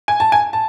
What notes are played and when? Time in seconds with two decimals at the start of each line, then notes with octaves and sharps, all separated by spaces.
0.08 G#5
0.20 A5
0.32 G#5
0.53 A5